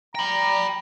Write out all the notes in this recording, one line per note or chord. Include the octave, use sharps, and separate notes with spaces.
G5 A#5 B5